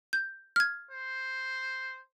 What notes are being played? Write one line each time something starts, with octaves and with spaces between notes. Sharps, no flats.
G6
F6 G#6
C5